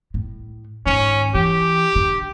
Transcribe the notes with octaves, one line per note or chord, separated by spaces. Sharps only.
A2
G#2 D#3 C#4
E3 G4
D3